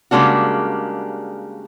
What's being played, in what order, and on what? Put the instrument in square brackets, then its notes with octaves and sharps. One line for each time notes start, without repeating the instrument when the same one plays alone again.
[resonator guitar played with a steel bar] C#3 G3 G#3 A#3 D4 F#4